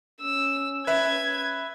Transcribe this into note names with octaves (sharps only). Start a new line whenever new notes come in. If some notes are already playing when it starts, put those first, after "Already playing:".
C#4 E6
B4 E5 G#6